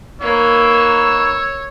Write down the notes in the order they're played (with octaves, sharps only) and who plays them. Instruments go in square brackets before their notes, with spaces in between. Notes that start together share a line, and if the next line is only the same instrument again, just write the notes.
[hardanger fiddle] A#3 [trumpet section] D#4 B4 C#6 [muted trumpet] C#5 [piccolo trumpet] E6